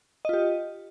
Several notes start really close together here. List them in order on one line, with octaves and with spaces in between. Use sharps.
D#5 F4 G4